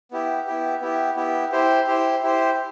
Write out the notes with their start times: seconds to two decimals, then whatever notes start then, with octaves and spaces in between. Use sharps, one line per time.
0.11 B3 E4 G4
0.47 B3 E4 G4
0.81 B3 E4 G4
1.16 B3 E4 G4
1.52 E4 G4 C5
1.87 E4 G4 C5
2.22 E4 G4 C5